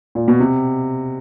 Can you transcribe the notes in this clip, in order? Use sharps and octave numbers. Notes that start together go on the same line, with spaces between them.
A#2
B2
C3